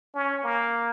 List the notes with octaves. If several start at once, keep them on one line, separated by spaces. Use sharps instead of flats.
C#4
A#3